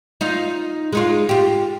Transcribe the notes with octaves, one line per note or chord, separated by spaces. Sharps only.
D#4 F4 F5
G#3 D#4 F4
F4 G4